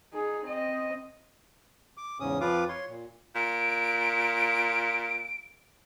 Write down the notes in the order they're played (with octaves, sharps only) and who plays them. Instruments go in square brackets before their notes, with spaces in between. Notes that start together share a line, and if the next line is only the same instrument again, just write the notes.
[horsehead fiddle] D#4 G#4
C4 D#5
[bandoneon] D6
E2 G#2 C#3 C#4 D#6
F2 F3 F4 B4 F5 D6
C#5 C6
A#2
[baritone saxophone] A#2 [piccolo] D7